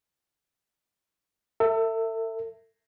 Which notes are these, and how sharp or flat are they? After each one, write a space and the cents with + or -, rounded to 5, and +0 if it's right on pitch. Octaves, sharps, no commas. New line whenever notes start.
A4 +40 E5 +0